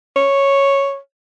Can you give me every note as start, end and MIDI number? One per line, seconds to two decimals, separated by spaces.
0.16 0.97 73